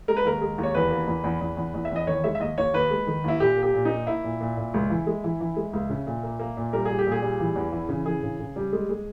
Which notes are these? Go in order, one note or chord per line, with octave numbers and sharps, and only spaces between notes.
G#3 A#4
B4
D#2 A#4
G#3
D#2
C#5
E2 B4
A#3
E2
E2
E2
E2
E2
E5
E2 D#5
D#3 C#5
G#3 E5
E5
D#2 D#5
D#2 C#5
D#2 B4
G#3
D#3
D#2 E4
A#2 G4
A#3
G4
A#2
A#3 D#4
A#3 E4
A#2
A#2
A#2
C#2
E3
G#3
E3
E3
G#3
C#2
C#3
A#2
A#3
A#3
A#2
G3 A#4
G3 G#4
G4
A#2
G#4
G3
E3
E2
E3
C#3
E3 G#4
C#3
C#3
G3
G#3
G#3